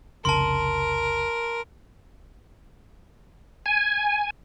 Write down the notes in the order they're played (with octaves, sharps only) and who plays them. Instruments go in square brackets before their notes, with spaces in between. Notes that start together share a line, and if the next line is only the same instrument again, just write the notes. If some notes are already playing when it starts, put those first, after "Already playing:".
[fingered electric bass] F1 C2 C#3 [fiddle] A#4 [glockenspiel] A5 C6
[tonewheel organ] G#5